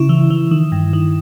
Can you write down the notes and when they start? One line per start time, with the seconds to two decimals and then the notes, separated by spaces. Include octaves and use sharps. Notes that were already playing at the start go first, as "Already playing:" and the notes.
Already playing: C#3 E4
0.09 E3
0.30 E3
0.51 D#3
0.72 G2
0.93 D#3